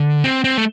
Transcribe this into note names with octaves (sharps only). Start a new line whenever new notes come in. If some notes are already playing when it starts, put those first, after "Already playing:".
Already playing: D3
C4
C4
A3